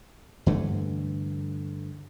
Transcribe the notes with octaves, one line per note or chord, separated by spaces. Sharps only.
G2 D3 E3 A3